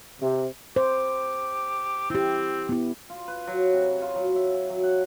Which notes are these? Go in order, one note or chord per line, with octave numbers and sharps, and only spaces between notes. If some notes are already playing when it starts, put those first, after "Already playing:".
C3
G4 C5
C4 E4 G4
B3 E4
F4
B4
F#3
C3
C#5
F4
F#3
E5
G#5
F#3
F#5